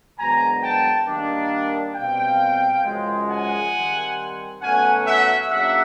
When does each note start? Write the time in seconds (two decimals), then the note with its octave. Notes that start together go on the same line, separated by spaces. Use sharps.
0.18 G#2 D#3 F#3 B3 D4 G#5 A#5
0.62 G5 A5
1.07 D#3 G3 A#3 D4
1.95 B2 G3 C4 F5 G5
2.84 F#2 C#3 F3 G#3
3.29 F#5 G#5
3.74 D#3 G3 C4
4.62 B2 F#3 A3 C#4 F#5 G#5
5.06 E5 F#5
5.50 C#3 F#3 A#3 D4 E5 F#5